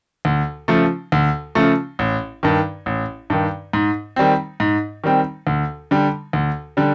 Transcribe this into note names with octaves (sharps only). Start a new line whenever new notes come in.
D2
C#3 F3 A3
D2
C#3 F3 A3
A1
G2 D#3
A1
G2 D#3
G#2
D#3 G3 C4
G#2
D#3 G3 C4
D2
D3 G3
D2
D3 G3